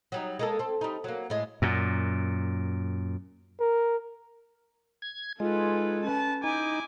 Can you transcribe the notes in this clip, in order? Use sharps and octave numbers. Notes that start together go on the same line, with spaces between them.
F#3 G3 D#4
G#3 A#3 A4
C4 A4
G3 D#4
F#3 A#3
A2 G#3
F#2 A#2
A#4
G#6
G#3 D#4 F4 A4 B4
C#4 B4 A5
D#4 E4 G#5 D6